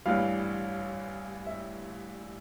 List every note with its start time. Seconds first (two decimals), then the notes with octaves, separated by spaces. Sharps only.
0.06 A1 G2 E3 G3 F5
1.46 E5